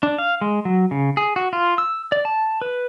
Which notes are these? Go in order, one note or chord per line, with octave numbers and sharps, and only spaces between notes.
D4
F5
G#3
F#3
C#3
G#4
F#4
F4
E6
D5
A5
B4